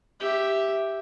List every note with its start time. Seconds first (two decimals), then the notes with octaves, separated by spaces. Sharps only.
0.20 G4 E5